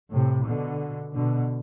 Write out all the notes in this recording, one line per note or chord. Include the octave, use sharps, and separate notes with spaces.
A2 C3
B2 D3
B2 D3